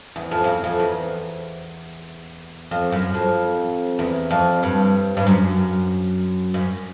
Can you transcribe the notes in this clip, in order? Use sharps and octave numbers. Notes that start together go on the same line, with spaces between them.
E2
F2
F2
E2
F2
E2
F2
F#2
F2
E2
F2
G2
G2
F#2
F#2